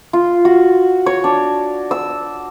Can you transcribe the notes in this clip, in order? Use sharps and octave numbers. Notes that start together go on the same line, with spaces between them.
F4
F#4
C#5
D4
E6